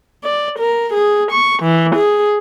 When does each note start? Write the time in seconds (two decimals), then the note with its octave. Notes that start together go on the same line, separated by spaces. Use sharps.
0.23 D5
0.59 A#4
0.93 G#4
1.31 C#6
1.63 E3
1.95 G#4